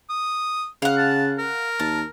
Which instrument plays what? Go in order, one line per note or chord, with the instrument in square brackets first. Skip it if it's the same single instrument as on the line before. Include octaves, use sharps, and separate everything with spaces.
[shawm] D#6
[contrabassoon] C#3 [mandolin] F5 F#5
[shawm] A5
A#4
[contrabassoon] D#2 [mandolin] A5